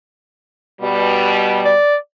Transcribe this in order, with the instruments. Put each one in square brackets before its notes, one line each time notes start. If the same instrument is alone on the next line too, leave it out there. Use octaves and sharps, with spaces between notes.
[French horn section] B2 G3
[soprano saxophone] D5